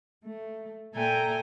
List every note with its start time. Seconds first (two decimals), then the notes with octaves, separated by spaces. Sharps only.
0.24 A3
0.93 A#2 A4 E5 G5 G#5 A#5